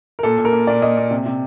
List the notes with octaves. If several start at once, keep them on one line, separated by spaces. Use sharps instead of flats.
A#4
A#2 A4
A#2
A#4
A#2
A#2 D5
A#2 D#5
A#2
C3
C3